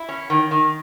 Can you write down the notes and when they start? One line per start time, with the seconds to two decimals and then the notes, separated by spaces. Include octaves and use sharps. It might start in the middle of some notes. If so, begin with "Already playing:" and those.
Already playing: E4
0.09 C#4
0.30 D#3
0.51 D#3